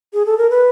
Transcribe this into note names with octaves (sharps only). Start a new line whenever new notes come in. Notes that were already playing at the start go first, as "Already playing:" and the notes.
G#4
A4
A#4
B4